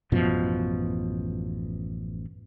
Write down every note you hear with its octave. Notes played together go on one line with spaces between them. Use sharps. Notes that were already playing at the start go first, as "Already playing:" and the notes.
A1 F#2 B2 F3